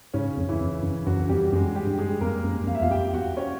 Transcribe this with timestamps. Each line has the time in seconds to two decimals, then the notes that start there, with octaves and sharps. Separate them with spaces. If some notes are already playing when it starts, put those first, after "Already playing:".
0.14 G#2 C#3 C#4
0.37 F2
0.49 E3 E4
0.61 F2
0.83 F#2
1.06 F#2 F#3 F#4
1.20 F#2
1.29 F2 G3 G4
1.52 F#2 G#3 G#4
1.75 G3 G4
1.87 G2
1.99 G#3 G#4
2.21 F2 A#3 A#4
2.44 F#2
2.67 F2 F5
2.75 E5
2.82 E2 F4 F5
2.91 F2 G4 G5
3.13 E2 F#4 F#5
3.37 C#4 C#5